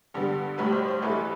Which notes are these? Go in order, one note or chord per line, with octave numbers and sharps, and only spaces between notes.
G2 D3 G3 B3
B1 A2 G3 B4
C5
C5
A1 G2 E3 A3 B4